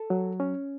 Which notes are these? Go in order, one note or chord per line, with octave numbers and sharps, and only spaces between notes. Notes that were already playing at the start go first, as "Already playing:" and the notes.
Already playing: A4
F#3
C#4